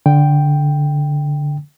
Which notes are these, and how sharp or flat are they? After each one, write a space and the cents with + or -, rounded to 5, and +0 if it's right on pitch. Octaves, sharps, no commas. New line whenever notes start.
D3 -10 G5 +0